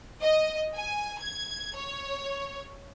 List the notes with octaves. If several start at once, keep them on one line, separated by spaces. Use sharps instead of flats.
D#5
G#5
G#6
C#5